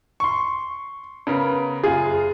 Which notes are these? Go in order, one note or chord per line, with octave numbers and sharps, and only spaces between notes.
C6 C#6
C#3 B3 A#4
F#1 F4 G#4